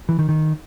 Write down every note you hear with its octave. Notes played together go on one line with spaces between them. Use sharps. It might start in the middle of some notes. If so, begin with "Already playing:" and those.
E3
D#3
D#3